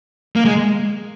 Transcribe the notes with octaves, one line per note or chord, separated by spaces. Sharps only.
A#3
G#3